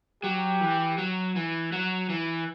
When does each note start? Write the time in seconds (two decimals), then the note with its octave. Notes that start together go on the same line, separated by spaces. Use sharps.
0.23 F#3 G4
0.61 E3
0.98 F#3
1.36 E3
1.72 F#3
2.10 E3